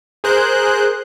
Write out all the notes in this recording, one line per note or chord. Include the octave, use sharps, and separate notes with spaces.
G#4 A#4 C5 F#6 G6